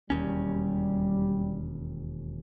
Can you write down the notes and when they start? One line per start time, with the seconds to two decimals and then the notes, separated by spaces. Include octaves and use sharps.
0.10 E1 D#2 G3 C#4